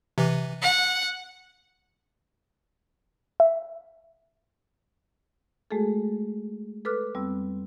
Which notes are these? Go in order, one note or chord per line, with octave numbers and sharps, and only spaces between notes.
C3 E3
F#5
E5
G#3 A3 F#4 G#4 A4
A4 B4 D6 F6 F#6
F2 G3 B3 C4 E6